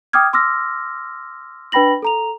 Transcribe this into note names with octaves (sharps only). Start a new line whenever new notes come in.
G5 D6 D#6 F6 G#6
C6 D6 E6 F6 A#6
D4 B4 G5 B5 A#6 F#7
A4 A#5 F7